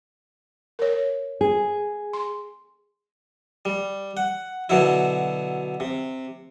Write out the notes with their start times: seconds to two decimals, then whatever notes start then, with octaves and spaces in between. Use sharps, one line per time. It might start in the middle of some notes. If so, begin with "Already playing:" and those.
0.79 A#4 C#5
1.41 G#4
2.13 C6
3.65 G3
4.17 F#5
4.69 B2 D3 F#3 E4
5.80 C3